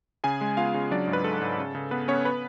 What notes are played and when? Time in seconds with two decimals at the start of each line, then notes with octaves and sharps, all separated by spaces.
0.24 C#3 G#4 G#5
0.41 G#3
0.57 B3 F4 F5
0.74 C#3
0.91 F#3 D4 D5
1.07 G#2
1.13 B4
1.24 G#2 A4
1.41 G#2
1.58 C#3
1.75 C#3
1.91 B3 B4
2.08 B3 C#4 C#5
2.25 B4